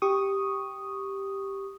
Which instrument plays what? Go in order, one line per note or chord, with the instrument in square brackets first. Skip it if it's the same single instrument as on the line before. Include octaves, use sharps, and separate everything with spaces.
[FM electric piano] G4 C#6 D#6